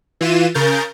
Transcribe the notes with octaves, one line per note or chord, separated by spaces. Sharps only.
E3 F4 D#7 E7
C#3 A#4 G6 A6